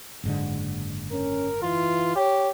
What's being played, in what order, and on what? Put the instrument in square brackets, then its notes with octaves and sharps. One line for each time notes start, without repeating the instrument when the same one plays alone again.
[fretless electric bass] F#1 G#2 D3
[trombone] C#4 [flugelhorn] A#4
[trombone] E3 [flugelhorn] F4
[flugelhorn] G4 [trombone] C#5